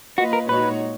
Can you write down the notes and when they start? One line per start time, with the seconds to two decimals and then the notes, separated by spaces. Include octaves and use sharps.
0.18 A#3 F4 F#4 B4 D#5
0.33 A#4
0.49 A#2 G#3 D#4 F#4 B4 C#5